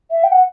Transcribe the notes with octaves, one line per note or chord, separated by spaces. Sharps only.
E5
G5
F#5